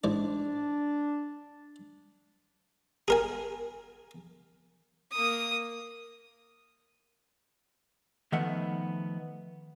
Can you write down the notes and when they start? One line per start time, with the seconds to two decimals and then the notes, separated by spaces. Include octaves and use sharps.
0.04 A1 G#2 D4 D5
3.08 G#4 A#4 G#5
5.12 A#3 D#6
8.32 D#3 F3 A3 B3 E5 F#5